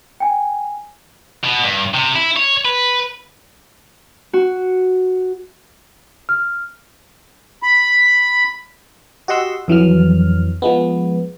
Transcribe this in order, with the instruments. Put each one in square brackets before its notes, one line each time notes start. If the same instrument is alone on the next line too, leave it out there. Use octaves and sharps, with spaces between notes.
[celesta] G5 G#5
[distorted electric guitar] B2
G2
C3
E4
C#5
B4
[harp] F#4
[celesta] F6
[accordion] B5
[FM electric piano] F#4 G4 D#5 F#5 C6 E6
F2 E3 F#3 F6
F3 G#3 B3